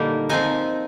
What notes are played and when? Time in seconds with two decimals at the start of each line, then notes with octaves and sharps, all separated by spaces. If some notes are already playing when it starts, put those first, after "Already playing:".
Already playing: A#2 D3 G3 A#3 D#4
0.29 F3 C4 D#4 G#5